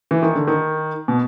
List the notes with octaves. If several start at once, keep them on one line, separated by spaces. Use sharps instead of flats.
E3
D#3
D3
D#3
B2